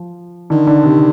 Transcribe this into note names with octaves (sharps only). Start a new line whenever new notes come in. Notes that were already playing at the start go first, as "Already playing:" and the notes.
Already playing: F3
D3 D#3
D3
C3